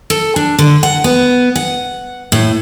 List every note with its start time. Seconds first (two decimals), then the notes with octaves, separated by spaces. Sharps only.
0.10 A4
0.36 D4
0.59 D3
0.83 F#5
1.04 B3
1.56 F#5
2.32 A2